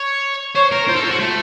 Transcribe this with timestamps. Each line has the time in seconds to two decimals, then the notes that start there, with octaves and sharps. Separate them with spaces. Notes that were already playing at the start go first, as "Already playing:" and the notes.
Already playing: C#5
0.56 C5 C#5
0.72 A#4
0.88 F4 C5
0.95 A4
1.04 F4
1.11 F#4
1.19 A3